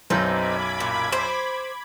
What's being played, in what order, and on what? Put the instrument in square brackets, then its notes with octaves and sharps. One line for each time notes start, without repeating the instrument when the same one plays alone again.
[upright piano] B1 F#2 [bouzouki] C4 D#4 B4 [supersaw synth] B5 D6 G#6
[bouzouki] A#2
C5